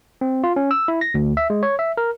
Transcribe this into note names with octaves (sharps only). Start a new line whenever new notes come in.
C4
F4
C#4
E6
E4
A#6
D2
E5
G#3
C#5
E5
A#4